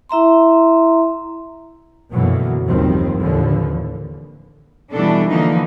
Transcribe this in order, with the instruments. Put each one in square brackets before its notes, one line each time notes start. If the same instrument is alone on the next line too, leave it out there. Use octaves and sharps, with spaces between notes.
[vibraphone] E4 E5 A#5 C6
[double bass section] F#2 B2 D3 E3 F#3 A#3
F#1 D#2 D#3 F3 G3 C4
D#2 A2 D3 E3 F3
[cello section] B2 E3 G3 D4 A4
D3 E3 F3 A#3 D#4